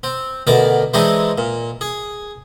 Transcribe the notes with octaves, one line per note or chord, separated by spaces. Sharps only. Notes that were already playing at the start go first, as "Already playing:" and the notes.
C4
D2 B2 A#4 D5
E3 G#3 C4 D4 D#4
A#2
G#4